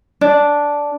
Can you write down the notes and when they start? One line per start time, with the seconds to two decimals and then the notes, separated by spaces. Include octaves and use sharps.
0.21 D4